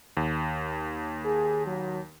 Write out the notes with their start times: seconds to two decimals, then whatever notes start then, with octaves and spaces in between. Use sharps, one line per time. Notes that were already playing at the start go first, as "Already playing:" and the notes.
0.17 D#2
1.25 G#4
1.66 F#3